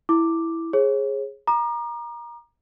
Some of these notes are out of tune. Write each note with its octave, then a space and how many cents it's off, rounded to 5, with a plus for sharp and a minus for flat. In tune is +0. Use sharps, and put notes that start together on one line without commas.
E4 +0 D6 +0
G#4 +0 C#5 -35
A#5 +20 D6 +45